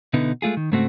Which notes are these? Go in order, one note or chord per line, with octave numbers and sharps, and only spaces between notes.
B2 D3 B3 D#4 E4
G#3 A3 F4 G#4
D#3
G#2 C#3 A3 C4 F#4